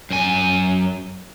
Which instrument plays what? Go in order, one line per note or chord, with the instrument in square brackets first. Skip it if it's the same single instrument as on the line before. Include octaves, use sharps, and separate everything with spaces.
[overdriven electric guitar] F#2 G#5